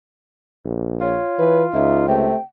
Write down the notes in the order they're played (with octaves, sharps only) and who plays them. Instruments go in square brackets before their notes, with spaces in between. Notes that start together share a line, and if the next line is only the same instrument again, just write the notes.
[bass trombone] A#1
[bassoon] F4 [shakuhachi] C#5
[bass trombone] E3 [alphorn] B4
[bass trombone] C#2 [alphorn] D#4 [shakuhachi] E5
[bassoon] C3 [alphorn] A3 [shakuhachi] G5